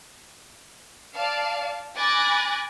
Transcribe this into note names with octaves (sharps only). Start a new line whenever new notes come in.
D5 F5 A5
G#5 B5 D6 F#6 A6 A#6